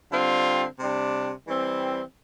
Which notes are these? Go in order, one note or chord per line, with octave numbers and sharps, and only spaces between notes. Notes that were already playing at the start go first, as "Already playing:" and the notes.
D3 G3 C4 F4
C3 G3 D4
E3 G3 C4